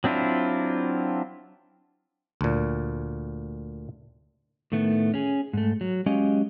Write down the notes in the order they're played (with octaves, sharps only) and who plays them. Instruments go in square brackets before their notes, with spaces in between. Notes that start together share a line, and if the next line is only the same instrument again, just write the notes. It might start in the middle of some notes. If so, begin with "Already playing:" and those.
[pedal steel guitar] F#3 C4 D4 E4 F4
[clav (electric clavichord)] D2 A#2
[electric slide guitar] A2 D#3 A3 B3
C#4 G#4
G#2 A3
F#3
F#3 G#3 C#4 G4 D#5 F5